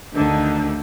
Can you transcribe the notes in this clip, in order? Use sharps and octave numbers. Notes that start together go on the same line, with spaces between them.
D2 D3 D#3 D4